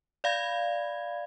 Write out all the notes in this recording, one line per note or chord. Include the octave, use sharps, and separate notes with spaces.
D5 F5 B5 G#6